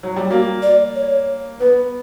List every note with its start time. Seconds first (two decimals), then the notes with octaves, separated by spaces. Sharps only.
0.03 F#3
0.17 G3
0.30 A#3 F#4
0.62 D5
0.95 C#5
1.60 B3 B4